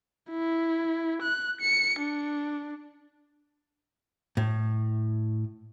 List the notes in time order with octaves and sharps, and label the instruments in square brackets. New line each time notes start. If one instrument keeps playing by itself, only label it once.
[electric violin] E4
F#6
C#7
D4
[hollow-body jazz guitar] A2